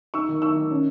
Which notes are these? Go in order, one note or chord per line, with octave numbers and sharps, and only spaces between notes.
D#4 C#6 E6
D#3
D#4 C#6 E6
D#3
C#4